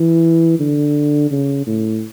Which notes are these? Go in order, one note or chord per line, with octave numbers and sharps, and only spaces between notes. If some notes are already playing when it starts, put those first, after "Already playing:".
Already playing: E3
D3
C#3
A2